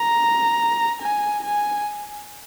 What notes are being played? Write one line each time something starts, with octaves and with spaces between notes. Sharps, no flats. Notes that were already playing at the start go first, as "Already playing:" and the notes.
Already playing: A#5
G#5
G#5